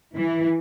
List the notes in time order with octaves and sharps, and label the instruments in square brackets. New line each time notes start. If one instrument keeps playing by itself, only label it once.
[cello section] E3